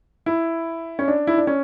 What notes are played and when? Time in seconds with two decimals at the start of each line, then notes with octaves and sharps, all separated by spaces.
0.26 E4
0.99 C#4
1.08 D4
1.27 E4
1.38 D4
1.47 C#4